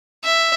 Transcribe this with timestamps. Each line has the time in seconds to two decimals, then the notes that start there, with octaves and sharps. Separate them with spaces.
0.24 E5